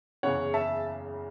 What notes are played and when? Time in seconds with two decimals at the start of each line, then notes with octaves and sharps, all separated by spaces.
0.23 F#1 E2 C#3 C#5 F#5
0.54 E5 A5